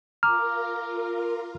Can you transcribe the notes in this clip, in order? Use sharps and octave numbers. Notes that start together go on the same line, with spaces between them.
F4 A#4 A#5 D6 F6